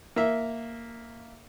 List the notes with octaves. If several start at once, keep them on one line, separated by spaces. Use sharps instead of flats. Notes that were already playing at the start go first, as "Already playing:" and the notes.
A#3 E5